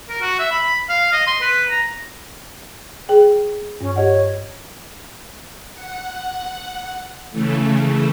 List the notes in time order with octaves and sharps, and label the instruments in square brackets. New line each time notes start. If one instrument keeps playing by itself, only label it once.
[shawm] A#4
F#4
E5
B5
F5
D#5
C6
B4
A#5
[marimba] G#4 G5
[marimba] G2 [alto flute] C#4
[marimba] G4 D#5 F#5 [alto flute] C#5
[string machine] F#5
C#3 E3 A3